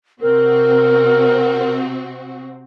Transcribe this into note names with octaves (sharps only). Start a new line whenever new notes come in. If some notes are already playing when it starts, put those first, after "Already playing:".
C3 C4 F#4 A#4